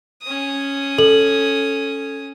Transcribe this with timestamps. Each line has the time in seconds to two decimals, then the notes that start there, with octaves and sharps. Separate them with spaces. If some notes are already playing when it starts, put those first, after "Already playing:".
0.22 C#4 D#6
0.98 A4 F#7